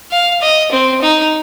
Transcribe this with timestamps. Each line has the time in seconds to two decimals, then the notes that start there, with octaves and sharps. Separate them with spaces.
0.11 F5
0.42 D#5
0.72 C4
1.02 D#4